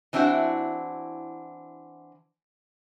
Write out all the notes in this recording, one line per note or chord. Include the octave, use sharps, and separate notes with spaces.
E3 C4 D4 E4 F#4